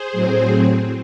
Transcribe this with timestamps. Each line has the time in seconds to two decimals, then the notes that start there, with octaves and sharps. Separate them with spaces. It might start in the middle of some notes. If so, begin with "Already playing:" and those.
Already playing: G#4 C5
0.12 A2 F#3 C4